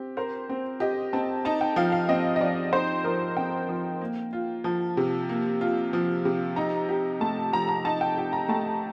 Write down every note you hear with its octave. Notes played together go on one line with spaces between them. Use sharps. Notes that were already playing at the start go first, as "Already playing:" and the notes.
Already playing: C4 G4
A#4 C5
C4
G4 D#5
C4 A5
D#4 A5
G5
F3 F5
F5
C4 D#5
D#5
F3 D5
D#4 C5
F3 A#4
C4 G5
F3
A#3
F4
F3 A5
C3
A#3
F4
F3
C3
D#4 A#5
G4
A3 A5
F3 A#5
A#5
D#4 A5
G5
G4
A#5
A3 A5